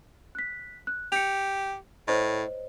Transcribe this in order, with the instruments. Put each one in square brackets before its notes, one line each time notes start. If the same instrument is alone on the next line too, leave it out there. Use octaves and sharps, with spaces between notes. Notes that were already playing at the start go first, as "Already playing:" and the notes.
[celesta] F#6 B6
F#6
[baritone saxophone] G4 [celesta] C#7 F7
[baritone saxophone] A2 [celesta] C5 C#5 D#5